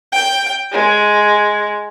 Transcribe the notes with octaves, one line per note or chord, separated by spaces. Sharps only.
G5
G#3